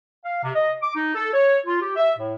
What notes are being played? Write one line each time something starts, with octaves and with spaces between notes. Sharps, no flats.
F5
C3
D#5
D6
D#4
A4
C#5
F4
G4
E5
A2